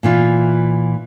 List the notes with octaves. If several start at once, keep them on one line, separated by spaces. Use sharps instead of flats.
A#2 E3 F4